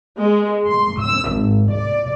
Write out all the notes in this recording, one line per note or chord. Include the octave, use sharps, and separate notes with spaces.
G#3
C6
E6
G#1
D5